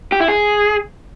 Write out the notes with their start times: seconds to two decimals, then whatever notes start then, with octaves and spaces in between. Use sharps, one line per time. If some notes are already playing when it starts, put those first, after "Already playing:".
0.12 G4
0.20 E4
0.28 G#4